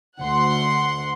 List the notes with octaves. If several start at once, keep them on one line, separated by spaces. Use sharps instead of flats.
D2 F#5 C6